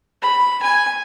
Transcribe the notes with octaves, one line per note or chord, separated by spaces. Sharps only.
B5
G#5